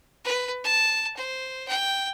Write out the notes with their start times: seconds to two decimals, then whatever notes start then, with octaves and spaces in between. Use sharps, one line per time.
0.25 B4
0.64 A5
1.17 C5
1.68 G5